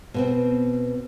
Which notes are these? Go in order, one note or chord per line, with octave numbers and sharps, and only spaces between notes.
B2 B3 C4